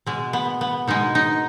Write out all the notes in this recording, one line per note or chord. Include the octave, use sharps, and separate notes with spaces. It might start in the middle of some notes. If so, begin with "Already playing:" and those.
B2 G#3
B3
B3
B2 G#3 D#4
D#4